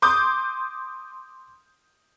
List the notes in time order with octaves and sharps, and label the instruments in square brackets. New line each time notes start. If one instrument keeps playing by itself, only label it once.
[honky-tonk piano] C6 D6 D#6 G6